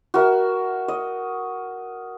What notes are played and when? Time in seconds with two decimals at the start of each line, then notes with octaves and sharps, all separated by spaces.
0.14 F#4 A#4 E5
0.88 D#5